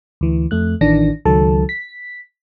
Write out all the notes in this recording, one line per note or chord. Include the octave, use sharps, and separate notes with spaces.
D2 E3
F2 A3 F#6
A1 D#3 E3 D4 A#6
C#2 D#3 F#3 A4 A5
B6